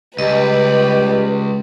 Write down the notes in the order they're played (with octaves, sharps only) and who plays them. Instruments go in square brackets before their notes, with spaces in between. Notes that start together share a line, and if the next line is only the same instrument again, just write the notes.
[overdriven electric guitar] C#2 [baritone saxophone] G3 [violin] B4 [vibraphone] D#5